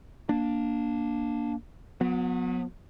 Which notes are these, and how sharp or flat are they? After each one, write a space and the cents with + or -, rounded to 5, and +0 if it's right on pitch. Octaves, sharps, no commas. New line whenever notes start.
A#3 +15 D4 +0
F#3 -35 B3 +0